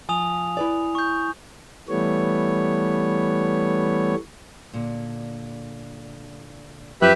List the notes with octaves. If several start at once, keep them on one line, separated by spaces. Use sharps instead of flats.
F3 G#5 D#6 F7
E4 B4 D5
C#6 G6
E3 G3 A3 B3 C#5
A#2 D3
F#2 F3 G4 B4 E5 F#6